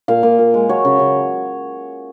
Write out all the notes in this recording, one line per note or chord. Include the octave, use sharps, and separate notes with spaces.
A#2 F5
A#2
A#2
G#3
F#3 C#5
C#3
C#3